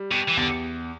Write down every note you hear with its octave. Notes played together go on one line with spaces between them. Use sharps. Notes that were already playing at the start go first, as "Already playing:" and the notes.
Already playing: G3
B2 G4
E3
E2 D3